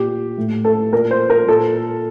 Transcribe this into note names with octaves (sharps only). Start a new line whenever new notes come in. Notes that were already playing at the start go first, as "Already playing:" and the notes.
Already playing: A#2 G4
A2
A4
A#2 A#4
C5
A#4
A#2 A4